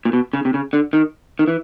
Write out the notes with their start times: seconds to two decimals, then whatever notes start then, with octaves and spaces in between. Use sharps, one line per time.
0.05 A#2
0.13 B2
0.33 C#3
0.45 C3
0.54 C#3
0.73 D3
0.93 D#3
1.39 D#3
1.48 E3